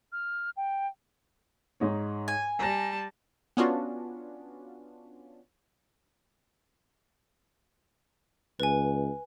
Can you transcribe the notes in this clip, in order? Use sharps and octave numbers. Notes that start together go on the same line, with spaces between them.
F6
G5
G#2 D#4 C#5
G#5
G3 A5 A#5 A#6
B3 C#4 D4 F4 F#4
C#2 B4 G#5